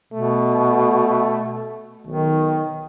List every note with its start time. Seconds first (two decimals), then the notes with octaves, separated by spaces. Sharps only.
0.13 B2 A3
2.07 B1 D#3